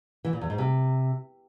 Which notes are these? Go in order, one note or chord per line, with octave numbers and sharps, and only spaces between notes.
E3
A#2
E2
G#2
C3